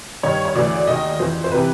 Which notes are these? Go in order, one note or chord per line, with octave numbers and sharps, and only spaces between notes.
G2 D#3 C#5
C#5
D2 C#3 E3 D5
D#2 D#3 D#5
F2 C#3 E3 C5
C5
C3 E3 B4